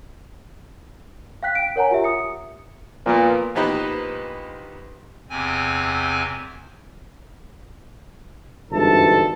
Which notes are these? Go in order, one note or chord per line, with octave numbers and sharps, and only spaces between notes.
F5 G5 F#6 B6
G5 D7
A#4 C#5 F#5 G#5 A#5
F4 G4 E5
D#6 C#7
A#2 F3 A#3 B3
A#1 B3 D#4 G4 B4 C5
E2 C3 C4 G#5
G#1 G2 D3 E3 A4 A5